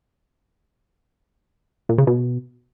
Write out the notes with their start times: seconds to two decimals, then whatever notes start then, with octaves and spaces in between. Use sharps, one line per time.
1.89 A#2
1.98 C#3
2.07 B2